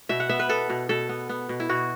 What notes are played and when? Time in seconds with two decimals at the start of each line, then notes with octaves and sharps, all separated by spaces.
0.09 B2 E5
0.20 F#5
0.29 B3 E5
0.39 B4
0.49 B3 A4
0.70 B2
0.89 B2 A4
1.09 B3
1.29 B3
1.49 B2
1.60 E4
1.69 B2 F#4